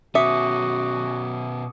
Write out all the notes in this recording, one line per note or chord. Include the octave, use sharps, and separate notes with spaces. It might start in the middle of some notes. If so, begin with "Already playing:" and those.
B2 C#4 F#4 E5 D6 D#6 C#7